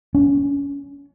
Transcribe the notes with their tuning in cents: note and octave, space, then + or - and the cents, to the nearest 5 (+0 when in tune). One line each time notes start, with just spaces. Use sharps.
C#4 +30